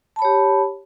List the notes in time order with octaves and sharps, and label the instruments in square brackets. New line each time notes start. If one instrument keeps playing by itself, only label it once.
[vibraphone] A5
B5
C#5
G4